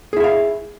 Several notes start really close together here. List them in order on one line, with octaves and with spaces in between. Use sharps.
G#4 E4 E5 F5